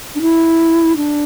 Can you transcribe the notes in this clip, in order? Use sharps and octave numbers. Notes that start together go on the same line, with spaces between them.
D4
E4
D4